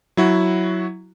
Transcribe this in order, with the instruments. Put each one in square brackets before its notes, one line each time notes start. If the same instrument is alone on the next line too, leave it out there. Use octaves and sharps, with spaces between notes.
[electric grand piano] F#3 E4 F#4